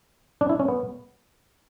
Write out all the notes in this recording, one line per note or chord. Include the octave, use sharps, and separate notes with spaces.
D4
E4
C#4
B3